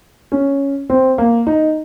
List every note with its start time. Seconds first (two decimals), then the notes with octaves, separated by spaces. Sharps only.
0.32 C#4
0.90 C4
1.18 A#3
1.47 D#4